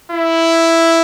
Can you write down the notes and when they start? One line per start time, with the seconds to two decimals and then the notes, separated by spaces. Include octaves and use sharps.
0.12 E4